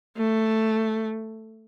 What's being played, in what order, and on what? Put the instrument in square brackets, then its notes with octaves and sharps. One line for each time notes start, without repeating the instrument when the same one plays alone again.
[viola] A3